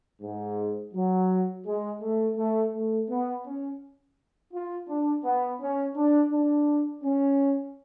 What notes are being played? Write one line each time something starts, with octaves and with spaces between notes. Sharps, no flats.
G#2
F#3
G#3
A3
A3
A3
B3
C#4
F4
D4
B3
C#4
D4
D4
C#4